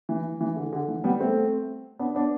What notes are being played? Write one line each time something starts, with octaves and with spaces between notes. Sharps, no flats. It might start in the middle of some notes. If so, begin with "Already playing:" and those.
E3
E3
D3
D3
E3
G3 B3
A3 C4
B3 D4
B3 D4